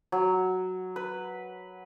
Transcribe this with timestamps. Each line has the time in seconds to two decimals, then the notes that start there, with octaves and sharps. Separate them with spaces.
0.12 F#3
0.96 B4